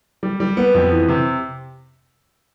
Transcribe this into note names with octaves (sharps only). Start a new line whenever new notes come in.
G3
G3
B3
F2
E3
C3